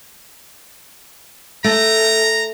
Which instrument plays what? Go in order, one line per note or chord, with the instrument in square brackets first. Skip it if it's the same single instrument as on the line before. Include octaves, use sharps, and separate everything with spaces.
[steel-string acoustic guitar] A3 [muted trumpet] A#5